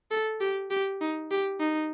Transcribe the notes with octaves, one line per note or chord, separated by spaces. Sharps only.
A4
G4
G4
D#4
G4
D#4